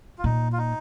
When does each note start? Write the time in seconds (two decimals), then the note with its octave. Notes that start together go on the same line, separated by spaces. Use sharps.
0.18 F4
0.24 A#2 D#4
0.52 F4
0.58 D#4